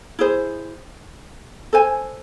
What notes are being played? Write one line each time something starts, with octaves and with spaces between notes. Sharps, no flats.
E4 G#4 C5
A4 C5 G#5